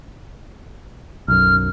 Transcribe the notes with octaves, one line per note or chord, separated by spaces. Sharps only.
B1 F#2 F6